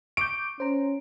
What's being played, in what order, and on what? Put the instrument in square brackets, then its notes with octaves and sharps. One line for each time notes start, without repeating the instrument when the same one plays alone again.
[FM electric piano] C#6 D6 G6 [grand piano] D7
[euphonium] C#4 [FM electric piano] C5 A#5